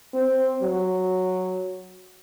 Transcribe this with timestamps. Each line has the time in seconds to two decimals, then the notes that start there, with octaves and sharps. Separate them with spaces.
0.13 C4
0.63 F#3